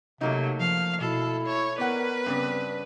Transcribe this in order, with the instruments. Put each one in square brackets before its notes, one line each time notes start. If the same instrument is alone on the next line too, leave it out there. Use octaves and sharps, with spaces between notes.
[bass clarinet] C3 [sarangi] F#3 [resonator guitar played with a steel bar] A3 A#3 D#4
[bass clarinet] F3 [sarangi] F5
[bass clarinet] B2 [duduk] E4 [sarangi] A4
[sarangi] C#5
[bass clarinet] B3 [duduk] A#4 [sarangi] B4 [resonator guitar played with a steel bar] D5 F#5
[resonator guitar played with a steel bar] G2 C#3 D4 [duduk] C4